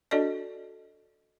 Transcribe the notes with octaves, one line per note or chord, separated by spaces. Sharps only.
D4 F#4 A4 D5 D#5